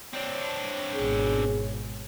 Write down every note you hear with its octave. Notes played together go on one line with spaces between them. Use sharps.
C4 D4 C#5
G#1 B2 G#4